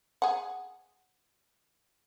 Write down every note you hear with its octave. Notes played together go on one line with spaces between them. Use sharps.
G#4 F#5